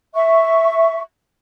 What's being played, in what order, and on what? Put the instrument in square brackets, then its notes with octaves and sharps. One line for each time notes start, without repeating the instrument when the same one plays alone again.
[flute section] E5 C#6